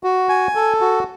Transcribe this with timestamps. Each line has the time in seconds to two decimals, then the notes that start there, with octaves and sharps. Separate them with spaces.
0.04 F#4
0.29 G#5
0.55 A4
0.81 F#4